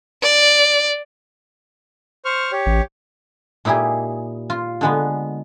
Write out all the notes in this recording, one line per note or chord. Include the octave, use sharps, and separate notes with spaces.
D5
C5 C#6 F6
G4 C#5
A1
A#2 D#4 E4 G4 G#4
F4
D3 G#3 B3